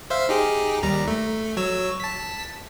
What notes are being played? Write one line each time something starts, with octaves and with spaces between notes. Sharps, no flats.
C5 E5 F5
D#4 G4 G#4
D#2 G3 A#5
A3
F#3 C#5 E6
A5 B6